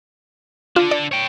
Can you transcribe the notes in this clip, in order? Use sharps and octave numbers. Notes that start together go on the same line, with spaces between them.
D4 F4 A4
D5
C#5 G5